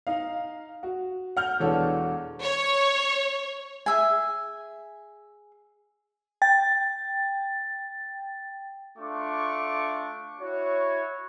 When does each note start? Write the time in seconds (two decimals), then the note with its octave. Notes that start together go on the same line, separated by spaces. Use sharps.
0.07 D#4 F5
0.83 F#4
1.37 F#5 F6 G6
1.60 E1 E3 D4 A4 C#5
2.42 C#5
3.86 G#4 E5 G#5
6.42 G5 A6
8.98 A3 D4 F4 C#6 D6
10.40 E4 F#4 C#5